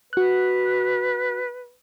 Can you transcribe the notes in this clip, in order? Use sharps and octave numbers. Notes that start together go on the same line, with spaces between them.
F#4 B4 F#6